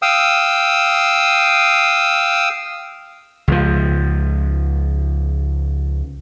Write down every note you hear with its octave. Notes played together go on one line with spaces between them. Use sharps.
F5 G5 D#6 E6
C#2 F3